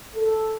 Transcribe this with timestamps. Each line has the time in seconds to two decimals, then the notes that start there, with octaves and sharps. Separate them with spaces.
0.15 A4